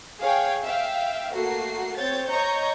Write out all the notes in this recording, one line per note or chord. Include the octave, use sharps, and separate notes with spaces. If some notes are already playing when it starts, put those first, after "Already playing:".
G#4 C#5 F5 G5 G#5
E5 F5 G5
A3 A#3 F#4 C7
C4 C#5 G6 A6
C#5 D#5 A#5 C#6 G6